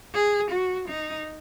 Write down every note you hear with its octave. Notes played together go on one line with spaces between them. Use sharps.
G#4
F#4
D#4